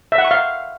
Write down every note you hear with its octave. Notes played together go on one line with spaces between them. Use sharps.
E5
F#5
C#6
F5